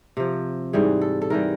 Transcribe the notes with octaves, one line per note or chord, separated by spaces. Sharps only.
C3 F3
G#2 E3 G3 G#4
A4
A4
G#2 E3 G3 A#4